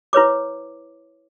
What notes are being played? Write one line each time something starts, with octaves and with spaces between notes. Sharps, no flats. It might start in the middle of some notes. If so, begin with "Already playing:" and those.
E4 B4 C#5 D6